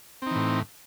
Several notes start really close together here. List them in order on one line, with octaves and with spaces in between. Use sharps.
C4 D#4 E3 A2